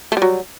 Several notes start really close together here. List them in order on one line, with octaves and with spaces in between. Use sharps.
A3 G3 F#3